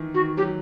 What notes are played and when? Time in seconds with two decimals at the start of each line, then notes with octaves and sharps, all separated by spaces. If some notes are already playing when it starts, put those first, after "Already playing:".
Already playing: D#3 E3
0.14 D#3 F#4
0.37 F#3 G4